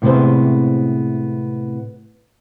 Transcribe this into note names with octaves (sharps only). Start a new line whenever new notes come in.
A2 C3 G#3 B3 C5